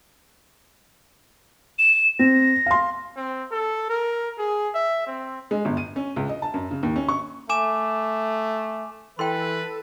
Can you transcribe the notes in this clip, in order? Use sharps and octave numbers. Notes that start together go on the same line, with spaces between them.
E7
C4 A#6
F5 C6
C4
A4
A#4
G#4
E5
C4
G#3
G1
D#7
C#4
C#2
D#5
A5
F#2
C#3
D#2
C#4
C#6
A3 G#5 D6 E7
E3 A4 B4 G5 C6